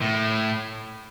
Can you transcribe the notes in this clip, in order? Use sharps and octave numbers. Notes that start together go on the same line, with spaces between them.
A2